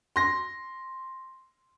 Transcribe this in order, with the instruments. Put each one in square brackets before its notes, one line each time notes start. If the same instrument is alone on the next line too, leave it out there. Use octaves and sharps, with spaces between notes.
[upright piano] C6 A#6